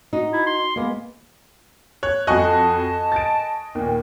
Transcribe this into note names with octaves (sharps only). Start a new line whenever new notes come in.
D#4 F#4
E4
C6
G#3 A#3 B3
C#5 F#6
F2 F#4 D#5 G#5 A5 C#6 F#6
A6 D7
D#2 A#2